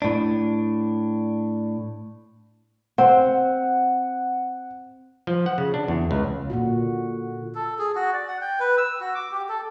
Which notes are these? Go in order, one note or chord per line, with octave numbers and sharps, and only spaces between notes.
A2 D4
C4 F#5
F3
F#5
C#3
D4
E2
C#2
A#2 D3 F#4
A4
G#4
F#4
D5
F#5
G5
B4
E6
F#4
D6
G4
A4